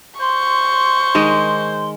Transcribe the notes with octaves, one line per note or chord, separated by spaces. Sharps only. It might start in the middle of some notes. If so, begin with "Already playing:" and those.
C5 C6 C#6
D#3 G#3 D#5